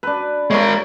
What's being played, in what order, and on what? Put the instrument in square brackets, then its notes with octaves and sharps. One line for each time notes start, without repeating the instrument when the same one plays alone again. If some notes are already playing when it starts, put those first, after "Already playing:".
[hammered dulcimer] D4 B4
[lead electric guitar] G#3 A#4 [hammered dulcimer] C#5